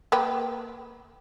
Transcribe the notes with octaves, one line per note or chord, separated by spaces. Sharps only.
A#3 B4 G5